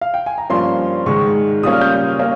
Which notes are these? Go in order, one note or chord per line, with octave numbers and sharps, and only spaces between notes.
F5
G5
G#5
A#5
G2 F3 A#3 C#4 C6
G#2 D#3 G#3 C#6
A#2 G3 A#3 C#4 D#6
F6
G6
A#3 C#4